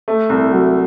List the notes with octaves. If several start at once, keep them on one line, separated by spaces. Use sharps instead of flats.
A3
C2
F#3